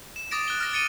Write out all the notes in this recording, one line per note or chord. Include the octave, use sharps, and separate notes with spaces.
E7
D6 D#6 A6 A#6 D7
F#6 A6 G7
F6 A#6
A6 C#7 D#7 G7